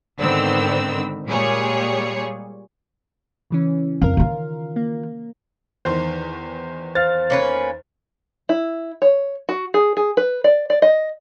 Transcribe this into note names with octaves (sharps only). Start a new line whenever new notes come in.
G#2 D3 D#3 B3 C4 E6
A#2 G3 G#3 G#4 C#5
C#3 E3 C#4
F2 A#4 F5
D#3 F4
A#3
E2 D#3 C5
C5 F5 F6 A6
A#3 C#4 B4
E4
C#5
F#4
G#4
G#4
B4
D5
D5
D#5